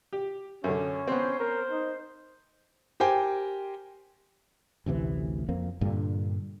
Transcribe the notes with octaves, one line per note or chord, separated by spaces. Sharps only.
G4
F#2 D3 C#4
B3 C4 C5
A#4
D#4
G4 A#4 C5 G5 G#5
A1 D2 C3 E3
F2 A#3 C4
G2 A#2 D3